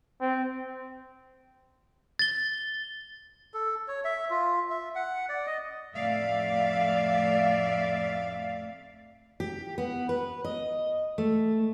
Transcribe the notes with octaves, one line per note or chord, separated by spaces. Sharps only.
C4
A6 G7
A4
C#5
E5
F4
E5
F#5
D5
D#5
F2 A2 A3 D5 E5 F5
G4
B3
B4
D#5
A3